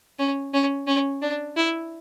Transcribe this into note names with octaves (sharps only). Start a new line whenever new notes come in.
C#4
C#4
C#4
D4
E4